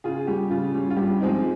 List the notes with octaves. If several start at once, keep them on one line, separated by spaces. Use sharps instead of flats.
C#3 F4 G#4
G3 C#4 G4
C#3 F4
G3 C#4
F4
G2 G4
F3 G#3 C4 D#4